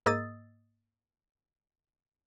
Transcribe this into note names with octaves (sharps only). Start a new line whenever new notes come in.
G#2 A#3 D#5 D#6 E6 A6